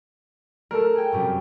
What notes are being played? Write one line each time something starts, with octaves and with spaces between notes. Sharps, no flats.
A3 A4 A#4
G#4 G5
F#2 C3 G3